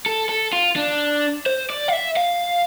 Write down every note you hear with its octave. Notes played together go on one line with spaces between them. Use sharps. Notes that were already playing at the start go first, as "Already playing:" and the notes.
A4
A4
F4
D4
C5
D5
F5
E5
F5